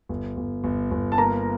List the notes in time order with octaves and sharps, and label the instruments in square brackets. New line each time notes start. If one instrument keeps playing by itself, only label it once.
[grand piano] G1
G1
G1
G1
[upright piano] A5
[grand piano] A#3 [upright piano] A#5